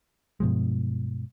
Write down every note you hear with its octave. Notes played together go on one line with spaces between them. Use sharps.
G2 B2 F3 G#3